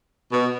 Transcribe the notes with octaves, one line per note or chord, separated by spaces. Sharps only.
B2